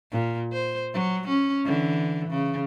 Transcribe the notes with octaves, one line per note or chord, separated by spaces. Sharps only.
A#2
C5
F#3
C#4
D3 E3
C#3